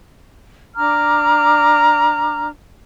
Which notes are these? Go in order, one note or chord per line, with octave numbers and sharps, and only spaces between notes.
D4 A#5 D6 F6